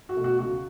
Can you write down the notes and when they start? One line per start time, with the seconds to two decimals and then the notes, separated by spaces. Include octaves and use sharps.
0.09 F#4
0.16 B2 A3
0.24 F#4
0.39 C#2 F#4